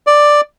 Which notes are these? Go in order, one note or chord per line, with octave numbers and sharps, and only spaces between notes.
D5